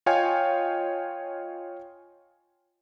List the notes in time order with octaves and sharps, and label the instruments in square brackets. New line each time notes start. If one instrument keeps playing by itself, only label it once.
[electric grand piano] F4 C#5 D#5 F5 G5 G#5